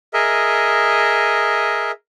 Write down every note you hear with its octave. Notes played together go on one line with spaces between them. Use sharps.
G#4 A#4 D#5 E5